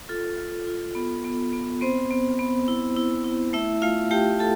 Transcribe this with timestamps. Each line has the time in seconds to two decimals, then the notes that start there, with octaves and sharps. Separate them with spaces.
0.09 F4 A4
0.38 F4
0.67 F4
0.95 B3
1.24 B3
1.53 B3
1.81 B3 C4 C5
2.11 B3
2.39 B3
2.68 E4
2.96 E4
3.24 E4
3.53 A3 E4 E5
3.82 A3 F4 F5
4.11 A3 G4 G5
4.39 A4 A5